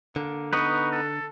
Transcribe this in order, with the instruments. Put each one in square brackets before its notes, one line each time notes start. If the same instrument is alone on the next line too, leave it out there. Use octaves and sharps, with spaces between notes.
[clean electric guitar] D3 [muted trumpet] A#3
[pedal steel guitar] B3 D#4 B4 [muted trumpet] C#6
[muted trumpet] A4